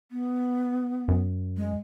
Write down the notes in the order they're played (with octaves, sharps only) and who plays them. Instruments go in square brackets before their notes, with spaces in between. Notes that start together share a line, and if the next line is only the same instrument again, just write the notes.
[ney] B3
[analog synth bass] F#2
[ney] G#3